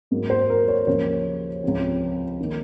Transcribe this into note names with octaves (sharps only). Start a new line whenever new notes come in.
G#2 F#3 A#3
C5
A#4
C#5
D#2 C#3 F3 A#3 C#5
C#2 C3 F3 C4
D#3 A#3